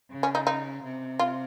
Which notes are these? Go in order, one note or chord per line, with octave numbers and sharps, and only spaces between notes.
C#3
C#4
D#4
D#4
C3
F4